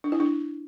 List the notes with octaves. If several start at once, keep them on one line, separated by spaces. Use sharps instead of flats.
D4
E4
D4